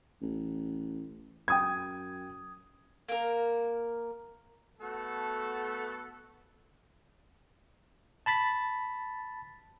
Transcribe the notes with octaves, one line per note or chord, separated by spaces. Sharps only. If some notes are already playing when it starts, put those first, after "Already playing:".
A1
F#2 G5 D#6 G#6
A#3 A#4
A3 B3 F#4 A4
A5 B5 A6 B6